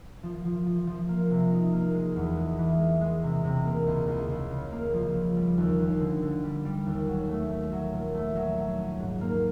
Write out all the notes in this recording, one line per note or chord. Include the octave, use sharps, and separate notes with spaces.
F3
F3
F3
F3
A#3
C3
D#4
A#3
G#3
E2
G#3
E3
G#3
G#3
C3
C3
A#3
C#2
C#2
C#2
C#3
A#3
F3
C#3
G3
D#2
D#2
D3
D3
G3
G3
D#2
F#3
A3
A3
F#3
A#2
A3
F#3
F#3
C#4
G#2
A#3